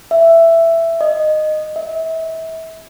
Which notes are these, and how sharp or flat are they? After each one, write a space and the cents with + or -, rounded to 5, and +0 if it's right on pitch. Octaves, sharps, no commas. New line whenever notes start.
E5 +10
D#5 -15
E5 -30